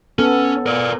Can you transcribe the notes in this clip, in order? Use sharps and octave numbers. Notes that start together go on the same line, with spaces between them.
B3 C#4 A4
A#4 D5